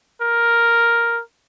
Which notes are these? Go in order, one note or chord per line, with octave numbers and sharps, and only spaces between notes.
A#4